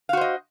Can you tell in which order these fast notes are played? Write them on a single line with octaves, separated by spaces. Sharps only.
F5 F#4 C5 D#5